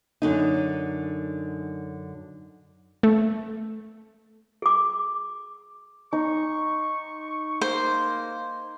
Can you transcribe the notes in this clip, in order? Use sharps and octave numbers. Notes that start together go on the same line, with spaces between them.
F#2 D3 D#4
A3
G#4 D6
D#4 C#6
A#3 C5